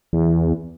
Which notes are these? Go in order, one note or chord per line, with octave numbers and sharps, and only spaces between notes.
E2